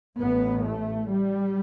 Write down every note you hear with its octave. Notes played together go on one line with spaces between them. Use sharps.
A1 A2 B3
A3
G3